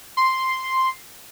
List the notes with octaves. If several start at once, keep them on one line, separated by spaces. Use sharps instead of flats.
C6